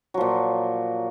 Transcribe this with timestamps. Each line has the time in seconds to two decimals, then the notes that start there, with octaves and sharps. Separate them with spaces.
0.14 F#3
0.17 F3
0.21 A#2